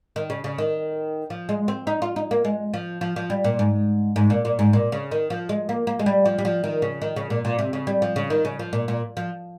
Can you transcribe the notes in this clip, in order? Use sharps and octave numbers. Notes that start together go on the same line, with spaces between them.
D#3
C#3
C#3
D#3
F3
G#3
C4
D#4
F4
D#4
A#3
G#3
F3
F3
F3
G3
A#2
G#2
G#2
A#2
A#2
G#2
A#2
C#3
D#3
F3
G#3
A#3
A#3
G#3
G3
F3
G3
F3
D#3
C#3
D#3
C#3
A#2
A#2
C3
C#3
G3
F3
C#3
D#3
C#3
F3
A#2
A#2
F3